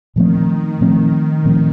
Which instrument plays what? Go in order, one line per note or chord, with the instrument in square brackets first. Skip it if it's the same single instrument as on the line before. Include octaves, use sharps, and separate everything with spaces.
[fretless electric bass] A#2 F3 A3 C4 [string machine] D#3
[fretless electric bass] A#2 F3 A3 C4
A#2 F3 A3 C4